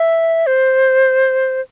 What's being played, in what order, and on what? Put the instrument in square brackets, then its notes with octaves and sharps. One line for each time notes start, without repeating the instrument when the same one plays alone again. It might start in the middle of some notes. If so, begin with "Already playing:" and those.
Already playing: [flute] E5
C5